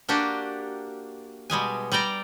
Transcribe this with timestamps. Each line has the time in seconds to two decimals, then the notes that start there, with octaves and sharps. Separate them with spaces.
0.09 A#3 D4 F#4 G4
1.50 B2 G3 G#3 G#5
1.92 G3 D5 G5 A#5